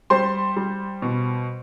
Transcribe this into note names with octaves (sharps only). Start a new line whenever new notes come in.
G3 C5 C6
G3
B2